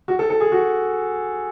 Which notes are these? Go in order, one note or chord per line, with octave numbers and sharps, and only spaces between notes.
F#4
A4
A4
G#4
F#4